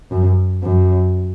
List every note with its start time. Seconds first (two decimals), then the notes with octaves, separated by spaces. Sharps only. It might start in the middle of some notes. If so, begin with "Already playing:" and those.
0.11 F#2
0.64 F#2